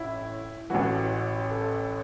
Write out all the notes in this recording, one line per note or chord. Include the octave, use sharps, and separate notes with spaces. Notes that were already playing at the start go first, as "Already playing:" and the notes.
Already playing: A1 A2 E4
A1 A2 E3 F#4
A4